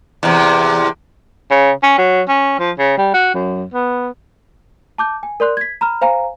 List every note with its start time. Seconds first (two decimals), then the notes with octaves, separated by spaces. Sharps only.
0.23 E2 C3
1.51 C#3
1.83 C#4
1.98 F#3
2.28 C#4
2.59 F3
2.78 C#3
2.98 G3
3.14 F#4
3.34 F#2
3.74 B3
4.98 A5 D6 G6
5.23 G#5
5.40 A#4 D5 C6 F#6
5.57 G#6 B6
5.81 A#5 B5 F6
6.01 C5 F5 G#5 A#5